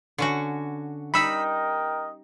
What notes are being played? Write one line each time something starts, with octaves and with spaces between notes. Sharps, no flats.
D3 C#4 F#4
G3 D#4 A#4 D#5 G5 B5 E6 B6